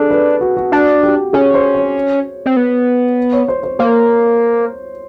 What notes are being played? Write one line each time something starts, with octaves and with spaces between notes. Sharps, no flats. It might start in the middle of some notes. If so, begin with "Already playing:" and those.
Already playing: D4 G#4 A4
B4
F#4
F#4
D4 F#4
G4
C#4 G#4
C5
C#5
C4
B3
C#5
C5
C5
A#3 C5